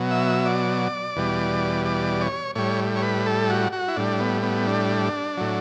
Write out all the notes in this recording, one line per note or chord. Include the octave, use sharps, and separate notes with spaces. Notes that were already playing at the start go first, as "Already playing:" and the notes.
Already playing: B2 F#3
E5
D5
E2 B2 G3
D5
C#5
A2 G3 C#5
C#5
B4
A4
F#4
F#4
E4
A2 G3 D4
B3
B3
D4
A2 F#3